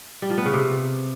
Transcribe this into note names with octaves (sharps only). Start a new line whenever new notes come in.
G3
F3
B3
C#3
C3